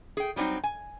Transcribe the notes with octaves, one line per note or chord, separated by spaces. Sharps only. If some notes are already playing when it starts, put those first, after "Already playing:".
G#4 G5
F#3 G3 C4 C#4 D#4
G#5